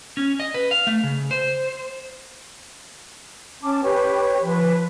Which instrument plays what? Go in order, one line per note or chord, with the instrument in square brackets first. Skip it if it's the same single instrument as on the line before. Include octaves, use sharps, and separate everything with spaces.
[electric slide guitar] C#4
D#5
B4
F5
A3
C#3
C5
[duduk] C#4 [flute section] A5 D6
[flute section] G4 B4 [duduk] C#5
[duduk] F3 [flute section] B4